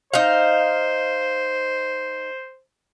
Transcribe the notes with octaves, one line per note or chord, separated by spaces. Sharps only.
D#4 C5 F5